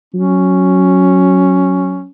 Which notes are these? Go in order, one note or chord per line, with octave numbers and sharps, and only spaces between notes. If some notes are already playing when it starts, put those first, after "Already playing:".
F#3 C#4